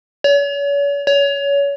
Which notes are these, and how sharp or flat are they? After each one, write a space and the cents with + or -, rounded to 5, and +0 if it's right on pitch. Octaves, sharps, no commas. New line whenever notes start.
C#5 +40
C#5 +25